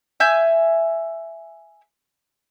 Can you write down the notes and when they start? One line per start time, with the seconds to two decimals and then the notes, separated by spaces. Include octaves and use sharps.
0.20 E5 G#5 G6